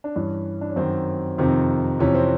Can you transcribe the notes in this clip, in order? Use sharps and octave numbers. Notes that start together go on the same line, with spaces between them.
D4
G2 E3 C#4
D4
C#4
F#2 D#3 C4
F2 C3 D#3 C4
F2 C3 E3 C#4
C4